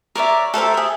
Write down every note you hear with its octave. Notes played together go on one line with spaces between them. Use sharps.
A#4 C#5 D5 E5
A4 A#4 C5 E5
G#4 E5